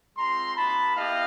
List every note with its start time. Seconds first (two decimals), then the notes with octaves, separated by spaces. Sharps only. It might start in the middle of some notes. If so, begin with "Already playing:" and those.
0.17 G#3 C4 F4 A#5 C6
0.56 A#3 D#4 F#4 A5 B5
0.95 B3 E4 G4 D#5 F5